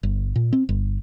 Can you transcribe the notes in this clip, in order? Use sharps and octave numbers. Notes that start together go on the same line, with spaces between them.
G1
A#2
C4
G1